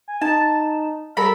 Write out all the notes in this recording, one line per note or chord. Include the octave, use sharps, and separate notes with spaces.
G#5
D#4 A5
G3 A4 A#4 B5